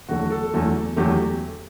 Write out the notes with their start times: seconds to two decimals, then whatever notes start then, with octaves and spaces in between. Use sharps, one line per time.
0.09 E2 D3 F#3 A3 F#4
0.31 A4
0.54 E2 D3 F#3 A3
0.96 E2 D3 F#3 A3 G4